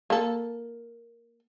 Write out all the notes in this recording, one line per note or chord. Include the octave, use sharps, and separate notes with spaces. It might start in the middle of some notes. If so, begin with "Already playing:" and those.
A#3 A4